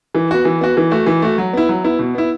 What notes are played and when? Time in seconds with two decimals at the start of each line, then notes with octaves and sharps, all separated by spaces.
0.14 E3
0.31 B3 F#4
0.45 E3
0.61 B3 F#4
0.77 E3
0.91 A3 F#4
1.06 E3
1.22 A3 F#4
1.38 F#3
1.53 B3 E4
1.69 F#3
1.84 B3 E4
1.99 B2
2.15 B3 E4